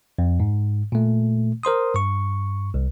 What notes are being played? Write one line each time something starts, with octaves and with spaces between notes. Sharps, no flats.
F2
G#2
A#2 A3
A#4 C5 C6 D#6
G2 C#6
C2